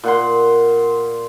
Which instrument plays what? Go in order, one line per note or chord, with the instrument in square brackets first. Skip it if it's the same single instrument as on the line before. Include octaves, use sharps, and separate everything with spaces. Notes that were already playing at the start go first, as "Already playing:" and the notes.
[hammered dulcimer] A#2 F#5 C6